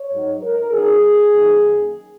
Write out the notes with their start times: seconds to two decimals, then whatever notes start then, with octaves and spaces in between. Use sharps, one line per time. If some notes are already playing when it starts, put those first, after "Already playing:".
Already playing: C#5
0.12 G#2 F#3 D#4
0.42 A#4
0.72 C#3 F#3 D#4 G#4
1.32 F#2 D#3 A#3